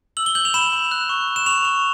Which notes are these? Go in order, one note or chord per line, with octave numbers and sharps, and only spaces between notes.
E6 F#7
G7
G6 F#7
F7
B5 E7
B5
F#6
C#6
F#6
E7
C#6 F7
C#6